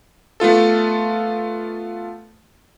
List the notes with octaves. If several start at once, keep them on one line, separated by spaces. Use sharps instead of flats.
A3 B3 F4 A4